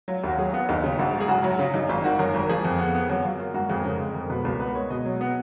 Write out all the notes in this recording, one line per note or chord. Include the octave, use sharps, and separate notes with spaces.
F#3 F4
D#2 F#4
F#3 G#4
B3 F4
D#2 D#4
C#3 F4
A#1 F#4
G#2
G#4
F#1 F#4
F#3
C#3 F4
F#2 D#4
G#1 F4
D#3 F#4
F#2 A#4
G#1
A#4
F3 G#4
F2
B3
B3
F#2 F#4
F#2 F4
A#3 F4
G#2 F#4
F2 G#4
C#3 A#4
G#3
F2
A#4
B2 B4
C#2 A#4
B3 B4
G#3 C#5
B2 D#5
F#3
B3